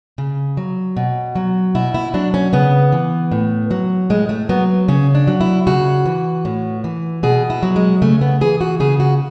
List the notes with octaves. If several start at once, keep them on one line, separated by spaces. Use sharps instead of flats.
C#3
F#3
B2
F#3
B2 E4
E4
F#3 D4
C#4
C#3 B3
E3
A2
F#3
A2 G#3
A3
F#3 B3
C#3 C#4
D4
F#3
E4
C#3 F#4
E3
A2
E3
B2 G#4
E4
F#3
G#3
C#3 A3
B3
E3 G#4
F#4
C#3 G#4
F#4